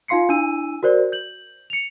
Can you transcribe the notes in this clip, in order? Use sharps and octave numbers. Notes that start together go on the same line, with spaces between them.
D#4 F4 F5 C6 C7 C#7
D4 E4 G#5 E6 D#7
F#4 A#4 C5 D5
G6 F#7
C#7 F7